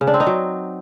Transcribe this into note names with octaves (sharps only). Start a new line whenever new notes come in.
C#3
D4
C4
D#4
F#3